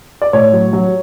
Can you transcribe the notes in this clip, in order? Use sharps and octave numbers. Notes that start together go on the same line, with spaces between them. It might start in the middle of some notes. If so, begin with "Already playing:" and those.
D5
A2 C#5
F#3
F#3